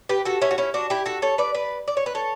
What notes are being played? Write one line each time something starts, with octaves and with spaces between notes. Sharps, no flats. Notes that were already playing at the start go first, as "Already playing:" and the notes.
G4 B4
F#4 A4
C#4 E4
F#4
C#4 E4
D4 F#4
E4 G4
F#4 A4
A4 C#5
B4 D5
B4 D5
D5
C#5
B4
A4 C#5